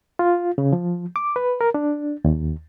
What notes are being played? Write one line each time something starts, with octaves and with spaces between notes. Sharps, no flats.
F4
C#3
F3
D6
B4
A#4
D4
D#2